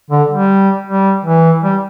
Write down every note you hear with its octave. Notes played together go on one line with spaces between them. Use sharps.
D3
G3
G3
E3
G3